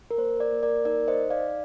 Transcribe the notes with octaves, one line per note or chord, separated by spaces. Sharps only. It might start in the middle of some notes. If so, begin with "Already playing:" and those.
A#4
A#3 C5
A#4 D5
A#3
A#4 D5
D#4 A#4 D5
C5 D#5
D#4
D5 F5